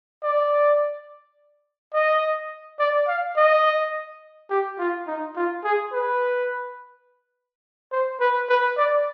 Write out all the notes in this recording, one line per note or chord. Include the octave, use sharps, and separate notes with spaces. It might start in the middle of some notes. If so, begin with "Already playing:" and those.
D5
D#5
D5
F5
D#5
G4
F4
D#4
F4
G#4
B4
C5
B4
B4
D5